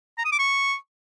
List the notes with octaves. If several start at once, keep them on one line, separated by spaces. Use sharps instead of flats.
A#5
D#6
D6
C#6